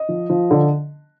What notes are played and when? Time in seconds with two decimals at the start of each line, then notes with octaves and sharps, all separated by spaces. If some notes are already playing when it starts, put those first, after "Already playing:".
Already playing: D#5
0.09 F3
0.30 F3
0.51 D3